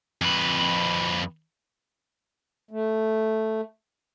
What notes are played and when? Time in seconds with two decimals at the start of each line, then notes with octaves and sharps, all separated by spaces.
0.22 F2 B4
2.71 A3